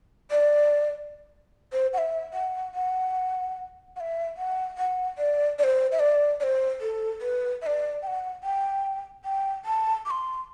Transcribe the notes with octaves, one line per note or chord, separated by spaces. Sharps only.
D5
C5
F#5
E5
F#5
F#5
F#5
E5
F#5
F#5
D5
D5
C5
E5
D5
D5
C5
A4
B4
E5
D5
G5
F#5
G5
G5
A5
D6
C6